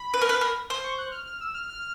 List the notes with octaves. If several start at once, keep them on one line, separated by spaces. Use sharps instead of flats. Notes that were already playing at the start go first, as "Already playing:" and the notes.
Already playing: B5
B4
A#4
B4
A#4
C5 C6
C#6
F#6
F6
F6
E6
F6
F6